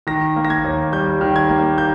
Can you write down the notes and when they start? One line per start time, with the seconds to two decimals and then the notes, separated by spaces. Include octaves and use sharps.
0.07 D#3 A#6
0.36 A#3
0.45 A#6
0.50 G#6
0.64 D#2
0.92 G3 G6
1.21 D#3
1.36 G#6
1.49 A#3
1.78 G6